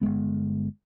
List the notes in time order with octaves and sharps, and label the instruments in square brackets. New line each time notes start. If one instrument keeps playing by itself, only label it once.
[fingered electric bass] G1 G2 G#3 B3